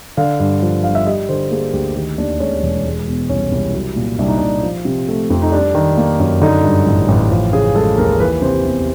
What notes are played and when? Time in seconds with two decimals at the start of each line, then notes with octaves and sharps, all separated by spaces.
0.17 D3 F5
0.40 G2
0.62 F3
0.83 G1 F5
0.95 E5
1.06 G3 D#5
1.29 D3 C5
1.51 A#3 G#4
1.73 D2 G4
1.96 D#3 G4
2.18 D#2 D4
2.40 G#3 C#4
2.63 E1
2.85 G#3
3.07 B2
3.29 C2 C#4
3.52 C2
3.74 F#3
3.96 A#2
4.19 C2 D4
4.28 D#4
4.38 C2 D4
4.63 F3
4.85 C3
5.08 A3
5.30 F2
5.42 D#4
5.52 G3 D4
5.75 D#3
5.97 A#3
6.20 F#2
6.41 D3 D#4
6.64 G2
6.86 A1
7.08 A1
7.31 F3
7.53 C#3 G#4
7.75 G#3 A4
7.98 D#2 A#4
8.20 E3 B4
8.42 C3 C5
8.65 E2